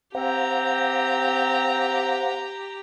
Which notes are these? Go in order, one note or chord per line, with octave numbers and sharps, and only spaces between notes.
C4 G4 C5 F5 F#5 A#5